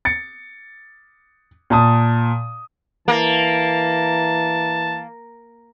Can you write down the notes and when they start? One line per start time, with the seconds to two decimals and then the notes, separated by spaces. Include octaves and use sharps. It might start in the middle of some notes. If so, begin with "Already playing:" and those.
0.05 A6 C#7
1.70 A#2 A5 D#6
3.08 E3 A#3 A5